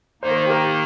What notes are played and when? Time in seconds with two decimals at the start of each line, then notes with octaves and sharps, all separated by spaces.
0.22 D#3 A#3 D#4 C5
0.31 A#4
0.37 C5
0.46 G4
0.50 A#4